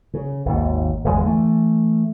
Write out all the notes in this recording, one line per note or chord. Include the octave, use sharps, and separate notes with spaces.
C#3
G#1 D#2
G1 E2 A#2 G#3
E3 A3